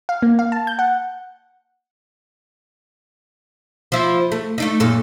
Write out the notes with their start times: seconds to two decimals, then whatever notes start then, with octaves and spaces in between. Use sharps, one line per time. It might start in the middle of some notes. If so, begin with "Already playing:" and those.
0.09 F5
0.22 A#3
0.39 F5
0.52 A5
0.67 G6
0.79 F#5
3.92 F3 E4
4.32 A3
4.58 A3 D4 D#4
4.80 F#2 A#2 A4